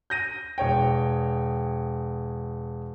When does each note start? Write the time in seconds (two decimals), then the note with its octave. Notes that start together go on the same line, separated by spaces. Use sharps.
0.10 G6 A#6 D#7
0.58 E1 C#5 G5